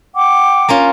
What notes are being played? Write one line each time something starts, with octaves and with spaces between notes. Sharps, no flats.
F#5 G5 D6
A#3 C#4 F4